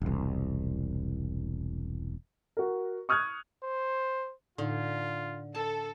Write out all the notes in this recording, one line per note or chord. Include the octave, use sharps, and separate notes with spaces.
E1 C2
F#4 A#4
C#6 D#6 F6 F#6 G#6
C5
A2 D3 D#4 F4
A4 A5